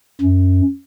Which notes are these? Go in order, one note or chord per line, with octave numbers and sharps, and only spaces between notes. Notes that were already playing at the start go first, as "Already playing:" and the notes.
F#2